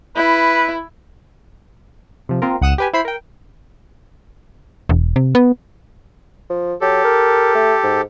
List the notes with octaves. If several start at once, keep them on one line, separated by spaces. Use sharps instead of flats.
E4 B4
C3 F3
A#3 C4 F4 A#4
C#2 F#5 D#6 F#6 E7
G4 B4 G#5
E4 C5 B5 C7
A#4 G5
E1
C3
B3
F3
F#3 G4 A4
A#4
A3
G#2